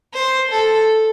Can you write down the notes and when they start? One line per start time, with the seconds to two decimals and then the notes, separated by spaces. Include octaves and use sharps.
0.13 C5
0.51 A4